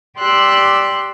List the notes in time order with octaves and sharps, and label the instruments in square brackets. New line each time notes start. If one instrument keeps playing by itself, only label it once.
[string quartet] G4 D5 C6 E6 F#6